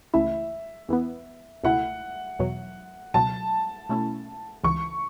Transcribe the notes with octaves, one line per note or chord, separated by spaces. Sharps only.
C#2 C#3 E3 A3 E4 E5
E2 E3 B3
C#2 B2 A3 E4 F#5
E2 B2 F#3
C#2 B2 F#3 A5
B2 A3 C#4 E4
C#2 C#3 E3 C#6